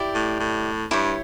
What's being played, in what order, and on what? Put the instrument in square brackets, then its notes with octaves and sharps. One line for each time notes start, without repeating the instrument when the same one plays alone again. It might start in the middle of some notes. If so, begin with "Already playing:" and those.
Already playing: [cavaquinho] E4 G4 D5
[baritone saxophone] A2
A2
[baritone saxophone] G2 [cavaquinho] E4 G4 C#5